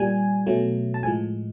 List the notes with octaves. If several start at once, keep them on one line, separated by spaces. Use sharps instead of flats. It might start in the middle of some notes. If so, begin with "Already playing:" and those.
Already playing: A#2 G3 G#5
B2 F#3 A3
A5
A2 F3 G#3 G#5